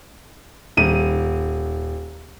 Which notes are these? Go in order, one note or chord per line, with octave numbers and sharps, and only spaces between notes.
D#1 D#7